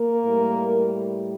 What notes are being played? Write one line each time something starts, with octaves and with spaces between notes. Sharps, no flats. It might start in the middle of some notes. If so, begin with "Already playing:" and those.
Already playing: A#3 A#4
A2 G3